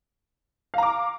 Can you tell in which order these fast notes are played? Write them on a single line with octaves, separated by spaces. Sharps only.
F5 A#5 D6